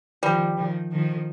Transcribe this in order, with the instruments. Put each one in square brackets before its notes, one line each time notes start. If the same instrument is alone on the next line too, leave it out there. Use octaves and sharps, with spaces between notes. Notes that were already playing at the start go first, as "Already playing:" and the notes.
[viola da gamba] D#3 F3 [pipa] G3
[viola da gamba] D#3 F3
D#3 F3